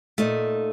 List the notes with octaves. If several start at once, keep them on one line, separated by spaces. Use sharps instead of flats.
A#2 A3 D#4